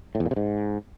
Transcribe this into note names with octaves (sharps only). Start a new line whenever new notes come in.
A2
E2
A#2
C3
G#2